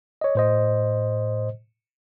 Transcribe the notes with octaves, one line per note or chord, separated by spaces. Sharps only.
C#5 D#5
A2 C5 D#5